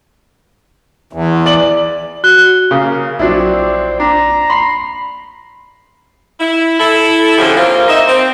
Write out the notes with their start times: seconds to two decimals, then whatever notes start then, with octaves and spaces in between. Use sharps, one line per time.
1.13 E2
1.46 D5 F#7
2.24 F#4 F#6 G7
2.71 C#3 A#3 D#6
3.19 A#1 F#3 C4 D4 E4 F4 D5
4.00 D4 A#5
4.50 B5 C6 C7
6.40 E4
6.79 E4 A4
7.38 D3 F3 F#3 C#4 G4 G#4
7.55 A#3 C4 F4
7.88 D#4 E5
8.08 C4